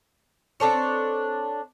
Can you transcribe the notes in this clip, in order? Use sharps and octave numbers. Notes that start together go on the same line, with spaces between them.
C4 D4 A4 C#5